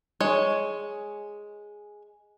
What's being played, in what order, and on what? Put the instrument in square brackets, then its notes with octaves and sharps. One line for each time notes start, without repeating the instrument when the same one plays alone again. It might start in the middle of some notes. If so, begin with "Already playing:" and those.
[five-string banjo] G#3 C#5